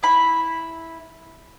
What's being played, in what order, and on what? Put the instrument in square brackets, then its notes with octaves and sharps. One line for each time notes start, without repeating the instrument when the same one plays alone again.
[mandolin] E4 B5